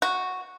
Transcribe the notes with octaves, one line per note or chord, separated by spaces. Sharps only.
F#4